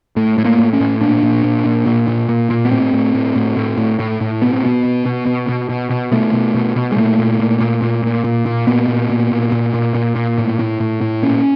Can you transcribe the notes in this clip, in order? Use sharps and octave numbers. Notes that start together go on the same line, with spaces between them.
A2 A3
A2 A3
A#3
A2
C#4
A2
A#2 D4
A#2
A#2
A#2
A#2
A#2
A#2
A#2
B3
A2 C4
A2
A2
A2
A2
A2
A2
A2
B2 B3
C4
B2 B3
B2
B2
B2
B2
B2
B2
B2 A3
B2
B2
B2
G#3
A#2 A3
A#2
A#2
A#2
A#2
A#2
A#2
A#2
A#2 B3
A#2
A#2
A#2
A#2
A#2
A#2
A#2
A2
A2
A2
A2
A#2 C#4